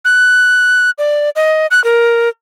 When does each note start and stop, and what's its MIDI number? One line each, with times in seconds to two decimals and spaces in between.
0.05 0.90 90
0.98 1.30 74
1.36 1.67 75
1.71 1.83 90
1.84 2.29 70